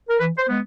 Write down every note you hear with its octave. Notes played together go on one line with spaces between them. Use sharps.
A#4
E3 B4
C5
G#3 B3